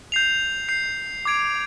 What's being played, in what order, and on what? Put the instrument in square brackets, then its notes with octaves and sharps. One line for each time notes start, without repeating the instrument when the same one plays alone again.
[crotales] G6 C7 F7
G6 C7 F7
D6 G#6 D7